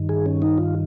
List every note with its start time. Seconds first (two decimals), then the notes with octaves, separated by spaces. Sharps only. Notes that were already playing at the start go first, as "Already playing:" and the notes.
Already playing: G2 D#3
0.09 G#4
0.26 C#4
0.42 D#4
0.58 F4